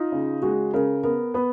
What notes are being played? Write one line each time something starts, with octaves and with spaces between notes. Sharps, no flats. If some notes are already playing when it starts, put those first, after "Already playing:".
Already playing: D#4 F4
C#3
G#3 F#4
C#3 A#4
B3 A#4
B3 B4